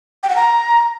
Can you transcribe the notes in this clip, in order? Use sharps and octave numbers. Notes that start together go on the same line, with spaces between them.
G5
F#5
A#5